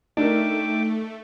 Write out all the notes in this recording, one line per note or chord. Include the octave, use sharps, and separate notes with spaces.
A3 D4 D#4 A#4 E5 G5 D6